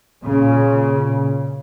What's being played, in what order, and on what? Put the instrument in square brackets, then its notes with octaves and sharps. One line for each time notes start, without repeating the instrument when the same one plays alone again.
[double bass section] A#2 C#3